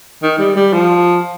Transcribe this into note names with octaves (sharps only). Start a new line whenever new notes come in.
D#3
G3
G3
F3